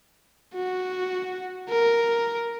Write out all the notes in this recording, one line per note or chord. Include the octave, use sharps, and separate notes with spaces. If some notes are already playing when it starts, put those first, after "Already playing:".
F#4
A#4